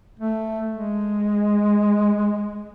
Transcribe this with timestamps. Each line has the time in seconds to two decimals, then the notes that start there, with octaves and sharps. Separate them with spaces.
0.20 A3
0.71 G#3